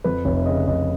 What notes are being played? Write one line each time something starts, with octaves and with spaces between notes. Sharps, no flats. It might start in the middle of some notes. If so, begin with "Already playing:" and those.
F2 B4
F1 C#5
C#3 D#5
F1 D#5